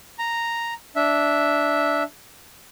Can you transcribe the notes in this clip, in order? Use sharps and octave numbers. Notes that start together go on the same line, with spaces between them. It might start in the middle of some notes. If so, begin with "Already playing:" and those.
A#5
D4 E5